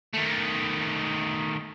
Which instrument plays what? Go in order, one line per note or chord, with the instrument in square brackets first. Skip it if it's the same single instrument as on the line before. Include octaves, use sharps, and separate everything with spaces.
[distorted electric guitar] D#3 A3